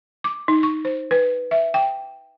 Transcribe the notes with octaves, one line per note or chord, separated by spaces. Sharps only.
D6
D#4
C#6
C5
B4
E5
G5